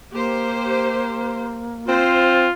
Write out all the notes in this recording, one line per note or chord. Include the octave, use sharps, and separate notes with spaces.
A#3 G4 C5
C4 F4 C5